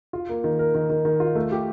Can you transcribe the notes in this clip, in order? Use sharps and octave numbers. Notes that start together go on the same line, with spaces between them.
F4
A#3
D#3
A#4
D#3
D#3
D#3
F4
A3
G4